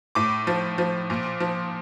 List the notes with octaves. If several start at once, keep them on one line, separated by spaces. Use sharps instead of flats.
A2 D6
F3
F3
A#2
F3